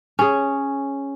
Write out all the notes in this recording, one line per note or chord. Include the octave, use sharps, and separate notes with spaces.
C#4 G#4